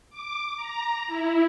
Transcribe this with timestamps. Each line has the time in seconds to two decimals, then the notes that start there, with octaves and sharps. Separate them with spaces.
0.10 D6
0.56 A#5
1.07 E4